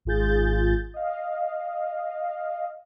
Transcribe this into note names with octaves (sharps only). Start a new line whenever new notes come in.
G#1 G#2 F4 G#4 G6 A6
D#5 F5